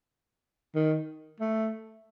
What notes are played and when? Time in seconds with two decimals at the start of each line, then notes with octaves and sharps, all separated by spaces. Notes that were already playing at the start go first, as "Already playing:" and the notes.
0.75 D#3
1.40 A3